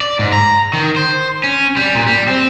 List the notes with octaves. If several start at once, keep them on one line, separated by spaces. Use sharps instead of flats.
D5
G#2
A#5
D#3
C5
C#4
G3
A#2
G3
C4